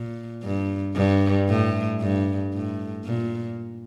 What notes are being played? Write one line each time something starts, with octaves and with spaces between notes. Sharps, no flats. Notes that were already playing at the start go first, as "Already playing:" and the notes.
Already playing: A#2
G2
G2
A2
G2
A2
A#2